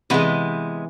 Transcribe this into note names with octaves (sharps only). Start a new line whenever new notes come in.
C3 E3 G#3 B3 D#5